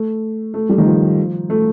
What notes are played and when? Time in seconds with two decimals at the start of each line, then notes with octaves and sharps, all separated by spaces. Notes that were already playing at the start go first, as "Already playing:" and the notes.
Already playing: A3
0.54 A3
0.69 G3
0.78 D#3
0.86 F3
1.50 A3